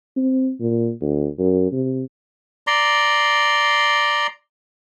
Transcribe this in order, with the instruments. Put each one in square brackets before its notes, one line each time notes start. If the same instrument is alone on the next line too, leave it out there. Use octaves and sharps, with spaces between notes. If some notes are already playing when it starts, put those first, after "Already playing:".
[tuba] C4
A#2
D2
F#2
C3
[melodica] D5 A#5 C6